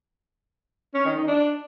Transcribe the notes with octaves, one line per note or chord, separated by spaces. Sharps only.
C#4
D#3
D#4
D4